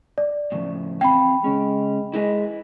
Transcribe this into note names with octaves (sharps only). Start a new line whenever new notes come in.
D5
A2 C#3 F3
E2 C4 F5 G5 B5
C#3 G#3 C#4
G#3 E4 B4 D#5